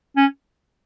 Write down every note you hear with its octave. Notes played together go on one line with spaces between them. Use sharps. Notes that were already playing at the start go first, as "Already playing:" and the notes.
C#4